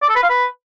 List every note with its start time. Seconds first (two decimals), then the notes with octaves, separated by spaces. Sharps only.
0.02 D5
0.09 A4
0.16 B4
0.23 F5
0.30 B4